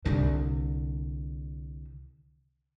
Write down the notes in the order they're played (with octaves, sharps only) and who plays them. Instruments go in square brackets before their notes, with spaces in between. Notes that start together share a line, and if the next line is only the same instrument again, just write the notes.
[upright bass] C2 D3